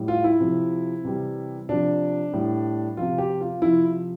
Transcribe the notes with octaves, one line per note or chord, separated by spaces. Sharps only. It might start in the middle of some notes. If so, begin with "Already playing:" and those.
Already playing: A2 G3
F4
E4
C3 F3
C3 E3 G3
C3 F3 D4
A2 G3
C3 F3 F4
G4
F4
C3 F3 E4